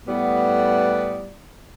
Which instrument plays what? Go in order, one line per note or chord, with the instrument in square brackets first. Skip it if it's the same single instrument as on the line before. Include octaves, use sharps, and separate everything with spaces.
[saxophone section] A2 G3 B3